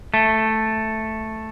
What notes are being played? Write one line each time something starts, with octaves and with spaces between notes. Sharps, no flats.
A3